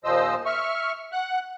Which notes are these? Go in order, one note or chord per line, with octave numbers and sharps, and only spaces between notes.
D#2 A#2 F3 C5 D#5 E6
E5 C#6 F6
F#5 F#6